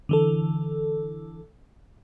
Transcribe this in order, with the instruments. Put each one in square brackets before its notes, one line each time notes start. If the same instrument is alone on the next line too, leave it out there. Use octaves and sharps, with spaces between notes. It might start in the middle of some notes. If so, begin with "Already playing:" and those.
[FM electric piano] D3 E3 A4